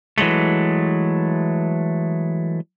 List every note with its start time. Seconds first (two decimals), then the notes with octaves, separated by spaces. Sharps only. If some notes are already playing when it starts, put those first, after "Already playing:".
0.18 E3 F#3 G#3 A3